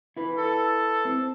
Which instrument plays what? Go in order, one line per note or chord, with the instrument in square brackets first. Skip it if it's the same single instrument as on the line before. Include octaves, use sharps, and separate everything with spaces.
[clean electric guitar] E4 B4
[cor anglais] A4
[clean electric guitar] C4